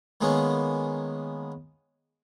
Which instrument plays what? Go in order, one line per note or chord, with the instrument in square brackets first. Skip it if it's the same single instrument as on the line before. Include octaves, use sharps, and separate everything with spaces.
[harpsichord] D#3 G#3 A#3 B3 C#4